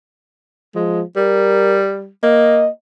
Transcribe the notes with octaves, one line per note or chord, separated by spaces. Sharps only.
F3 G#3
G3 A#4
A#3 D#5